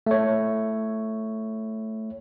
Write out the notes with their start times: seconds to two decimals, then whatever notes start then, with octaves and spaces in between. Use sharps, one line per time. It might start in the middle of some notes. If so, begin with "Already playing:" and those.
0.07 A3 C#5